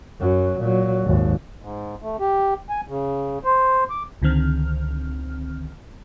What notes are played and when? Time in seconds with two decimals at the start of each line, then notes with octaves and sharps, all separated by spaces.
0.20 F#2 F#3
0.60 A#2 F#3
1.05 G#1 D#2
1.62 G#2
2.02 A3
2.20 G4
2.69 G#5
2.88 C#3
3.44 C5
3.90 D6
4.22 C#2 D3 D#3 C4 F6